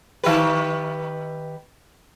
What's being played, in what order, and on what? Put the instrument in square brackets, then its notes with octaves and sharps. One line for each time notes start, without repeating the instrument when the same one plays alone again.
[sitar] D#3 G4 B4